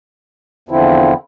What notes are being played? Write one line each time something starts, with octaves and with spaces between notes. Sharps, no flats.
E2 D3 F3 C4 E4